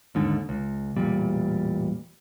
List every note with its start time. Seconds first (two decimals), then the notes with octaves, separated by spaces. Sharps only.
0.15 D#2 G#2 D3
0.49 C#2
0.96 E1 A1 A#2 G3